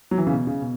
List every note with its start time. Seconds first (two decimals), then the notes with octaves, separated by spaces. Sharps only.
0.11 F#3
0.18 E3
0.27 C#3
0.32 B2
0.47 C#3
0.61 B2